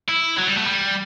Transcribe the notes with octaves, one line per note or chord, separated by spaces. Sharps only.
E4
F#3
G3
A3
G3